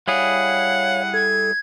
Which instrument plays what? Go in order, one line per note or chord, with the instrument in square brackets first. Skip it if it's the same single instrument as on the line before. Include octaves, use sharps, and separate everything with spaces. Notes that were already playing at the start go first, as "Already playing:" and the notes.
[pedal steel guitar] G3 E4 G#4 [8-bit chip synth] C#5 F5 [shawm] F#5
[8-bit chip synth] A4 [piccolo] G#6